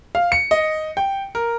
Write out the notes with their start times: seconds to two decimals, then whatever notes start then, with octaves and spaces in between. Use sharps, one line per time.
0.15 F5
0.32 C#7
0.51 D#5
0.97 G5
1.35 A#4